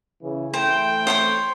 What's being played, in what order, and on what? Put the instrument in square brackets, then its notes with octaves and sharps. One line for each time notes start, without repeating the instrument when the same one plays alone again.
[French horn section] C#3 E3
[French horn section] E3 A3 [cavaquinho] C5 [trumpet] G5
[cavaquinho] C5 C#5 C6